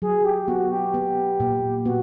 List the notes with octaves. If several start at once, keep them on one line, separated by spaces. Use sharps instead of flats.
F#3 G#4
G4
B3 F#4
G4
B3
A#2
B3 F#4